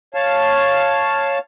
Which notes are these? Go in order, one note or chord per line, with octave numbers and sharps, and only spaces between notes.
C#5 F5 A5